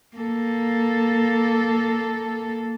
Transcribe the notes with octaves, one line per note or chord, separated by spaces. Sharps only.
A#3 A4